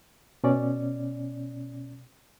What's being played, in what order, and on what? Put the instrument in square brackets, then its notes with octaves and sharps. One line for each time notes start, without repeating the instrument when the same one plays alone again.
[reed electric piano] B2 C#4 D5